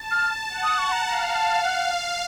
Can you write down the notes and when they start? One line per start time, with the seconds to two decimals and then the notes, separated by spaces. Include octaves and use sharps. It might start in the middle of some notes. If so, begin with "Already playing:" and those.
Already playing: A5
0.11 F6
0.49 F#5
0.63 D#6
0.78 C#6
0.92 A#5
1.06 F5 A#5
1.29 A#5
1.35 A5
1.64 F#5